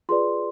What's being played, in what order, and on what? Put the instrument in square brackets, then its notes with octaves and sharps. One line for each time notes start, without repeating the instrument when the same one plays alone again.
[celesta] F4 G#4 B4 D5 C6